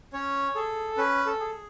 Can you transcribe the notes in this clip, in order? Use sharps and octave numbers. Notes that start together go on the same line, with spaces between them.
C#4 C#5
G#4 A4
C#4 B4
A4
G#4